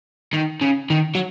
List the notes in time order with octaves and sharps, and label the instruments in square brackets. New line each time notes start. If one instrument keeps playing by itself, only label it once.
[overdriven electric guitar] D#3
C#3
D#3
F#3